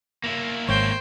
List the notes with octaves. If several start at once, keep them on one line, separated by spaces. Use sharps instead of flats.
A#3 E4
G#1 C5 C#5 G5